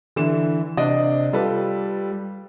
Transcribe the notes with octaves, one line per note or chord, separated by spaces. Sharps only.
D3 E3 E7
C3 D4 D5 D#5
G3 F4 A4 B4